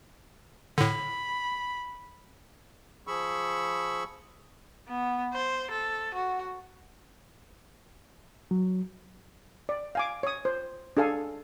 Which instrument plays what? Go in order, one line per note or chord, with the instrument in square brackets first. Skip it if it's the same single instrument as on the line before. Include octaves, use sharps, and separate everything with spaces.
[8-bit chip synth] A2 D3 [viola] B5
[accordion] F3 G#4 B5 C#6 E6
[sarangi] B3
C5
A4
F#4
[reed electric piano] F#3
[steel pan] D5
F5 G#5 D6
C#5 D#6
C5
D4 G#4 A4 F5 G#5